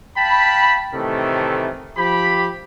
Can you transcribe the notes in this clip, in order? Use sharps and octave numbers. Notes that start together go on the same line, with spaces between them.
F5 G5 A5 B5
A2 C3 D#3 E3 A3 A4
F3 G4 B5